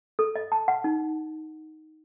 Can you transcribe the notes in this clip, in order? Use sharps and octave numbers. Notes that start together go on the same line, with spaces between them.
A4
D#5
A5
F#5
D#4